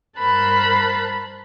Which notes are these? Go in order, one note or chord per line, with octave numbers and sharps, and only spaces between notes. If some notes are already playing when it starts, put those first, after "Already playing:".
G2 A#4 C5 A5 B5 F#6